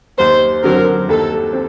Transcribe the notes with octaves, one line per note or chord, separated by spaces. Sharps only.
D#2 C5
D3 F#3 C4 A#4
D#2 A4
C4